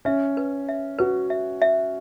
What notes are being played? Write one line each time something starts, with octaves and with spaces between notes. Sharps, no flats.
C#4 E5
B4
E5
F#4 B4
E5
E5